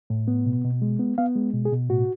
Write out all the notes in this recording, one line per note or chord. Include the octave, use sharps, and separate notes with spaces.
A2
B3
B2
B2
G#3
B3
B3 F5
G#3
B2
G#4
B2
A2 F#4